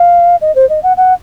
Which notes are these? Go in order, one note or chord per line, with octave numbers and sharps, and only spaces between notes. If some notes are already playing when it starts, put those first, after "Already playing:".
Already playing: F5
D#5
C5
D#5
F#5
F#5